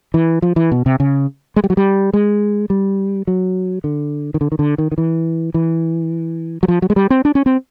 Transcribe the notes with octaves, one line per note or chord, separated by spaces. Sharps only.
E3
F3
E3
B2
C3
C#3
G#3
G3
F#3
G3
G#3
G3
F#3
D3
D#3
D3
D#3
D3
D#3
D#3
E3
E3
F#3
F3
F#3
G#3
G3
C4
D4
C#4
C4